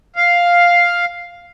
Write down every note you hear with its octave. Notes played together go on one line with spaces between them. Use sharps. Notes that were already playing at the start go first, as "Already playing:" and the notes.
F5